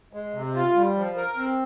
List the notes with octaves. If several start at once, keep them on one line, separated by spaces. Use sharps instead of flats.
G#3
C3
F4
G3
F3
A#4
C4